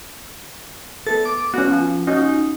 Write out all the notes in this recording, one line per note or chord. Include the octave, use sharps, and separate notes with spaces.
B3 A4 A6
D6
B3 C#4 F#4
F3
C#4 D#4 F4 F#4